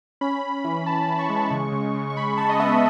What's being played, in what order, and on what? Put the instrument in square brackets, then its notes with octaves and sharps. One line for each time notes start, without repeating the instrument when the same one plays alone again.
[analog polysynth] C#4 B5
C#4
E3
E3 A5
E3
C#6
G#3
C#3
C#3
C#3
C#6
C#3 B5
C#3 A5
D#5
B3 E5